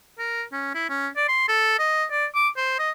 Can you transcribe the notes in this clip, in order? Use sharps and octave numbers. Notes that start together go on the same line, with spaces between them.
A#4
C#4
E4
C#4
D5
C6
A4
D#5
D5
D6
C5
D#5